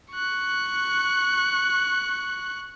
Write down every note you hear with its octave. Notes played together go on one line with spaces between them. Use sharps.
C#6 F#6